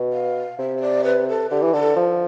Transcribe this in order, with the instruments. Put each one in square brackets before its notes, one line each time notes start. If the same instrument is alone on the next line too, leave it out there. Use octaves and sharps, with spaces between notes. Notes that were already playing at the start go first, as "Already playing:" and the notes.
Already playing: [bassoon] B2
[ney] F5
[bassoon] C3 [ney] E5
[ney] C5
D5
B4
A4
[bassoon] D3 [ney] G4
[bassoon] E3
[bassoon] D3 [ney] A4
[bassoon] F3